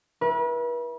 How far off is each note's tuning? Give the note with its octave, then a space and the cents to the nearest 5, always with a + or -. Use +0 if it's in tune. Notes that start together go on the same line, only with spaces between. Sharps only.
E4 +0 B4 -40